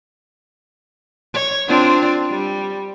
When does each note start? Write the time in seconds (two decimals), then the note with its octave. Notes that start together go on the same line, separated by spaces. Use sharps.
1.34 C#5
1.67 C4 D4 F4
2.30 G3